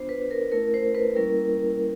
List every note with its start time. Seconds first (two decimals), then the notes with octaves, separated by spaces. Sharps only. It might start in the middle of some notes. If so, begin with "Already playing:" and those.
Already playing: B3 D4 F4 C5
0.09 B4
0.31 A#4
0.52 A3 C#4 E4 A#4
0.74 C5
0.95 B4
1.16 G3 A#3 C#4 E4 A#4